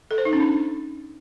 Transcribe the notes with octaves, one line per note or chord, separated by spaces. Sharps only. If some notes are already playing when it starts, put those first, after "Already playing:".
A4
C5
D#4
C#4
D4